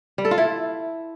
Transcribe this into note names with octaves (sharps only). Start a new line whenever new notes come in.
G3
A4
F4
E4